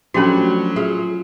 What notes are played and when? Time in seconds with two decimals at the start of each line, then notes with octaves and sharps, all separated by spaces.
0.14 F3 F#3 A3 C#4 D4 F#4 G4 B5
0.76 F4 G#4 E5